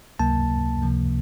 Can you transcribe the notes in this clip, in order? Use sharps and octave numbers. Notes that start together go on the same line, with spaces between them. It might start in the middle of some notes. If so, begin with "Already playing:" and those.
C#2 C3 F#3 A#3 A5
C#2 C3 F3 A#3